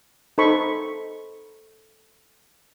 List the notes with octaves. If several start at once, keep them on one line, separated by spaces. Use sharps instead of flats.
D#4 A4 C5 B5 C#6